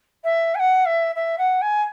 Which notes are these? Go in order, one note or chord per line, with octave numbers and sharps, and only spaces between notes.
E5
G#5
F#5
E5
E5
F#5
G#5